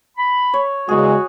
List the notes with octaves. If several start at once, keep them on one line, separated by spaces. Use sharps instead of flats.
B5
C#5
E2 C#3 F#3 G#3 F#4 G#4